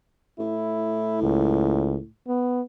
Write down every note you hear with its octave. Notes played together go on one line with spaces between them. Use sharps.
A2 E4
C#2
B3